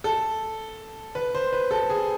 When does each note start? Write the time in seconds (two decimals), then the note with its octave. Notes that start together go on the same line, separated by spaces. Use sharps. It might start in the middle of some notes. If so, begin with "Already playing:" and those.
0.04 A4
1.15 B4
1.34 C5
1.53 B4
1.71 A4
1.89 G#4